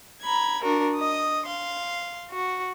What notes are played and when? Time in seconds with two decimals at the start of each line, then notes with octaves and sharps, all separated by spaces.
0.22 A#5 B5 G#6
0.62 D4 F#4 A#4
0.97 D#5 D#6
1.46 F5 C6
2.31 F#4